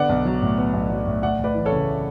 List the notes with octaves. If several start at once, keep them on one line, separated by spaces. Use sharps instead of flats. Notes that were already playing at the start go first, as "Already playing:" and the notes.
Already playing: D3 B3 D5 F#5
B1
F#3
A2
B3
B1
F#3
A2
D2 D5 F#5
D2 B4 D5
E3
A4 C#5
C#3